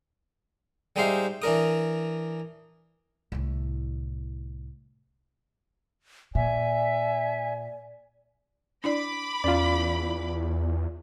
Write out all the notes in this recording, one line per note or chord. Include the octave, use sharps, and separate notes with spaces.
G3 G#3 D#4 C5 E5 F5
E3 D4 A#4 D#6
C2 A2
A#2 D5 E5 G#5
D4 E4 D5 B5 D6
E2 C#4 F4 D5